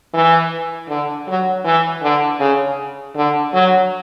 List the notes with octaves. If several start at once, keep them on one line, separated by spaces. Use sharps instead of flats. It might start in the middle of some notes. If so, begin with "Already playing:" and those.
E3
D3
F#3
E3
D3
C#3
D3
F#3